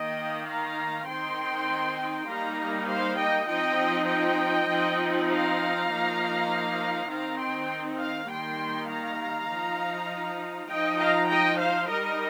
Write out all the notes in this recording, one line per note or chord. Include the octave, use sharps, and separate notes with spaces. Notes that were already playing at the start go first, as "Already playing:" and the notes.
Already playing: D#3 A#3 D#4 D#5 G5
F5 A#5
D#3 C4 D#4 G5 C6
G3 A#3 D#4 F5 A#5
C5 F5
D#5 G5
F3 C4 D#4 D#5 G5
D#5 G5
F3 C4 D#4
F5 A#5
F3 A#3 D#4
D#3 C4 D#4 F5 A#5
G5 C6
F5 A#5
D#3 G3 A#3 D#4 G5 C6
F5 A#5
F3 D#4
F3 D#4 D#5 G5
F5 A#5
D#5 G5
C5 F5
G3 D#4 A#4 D#5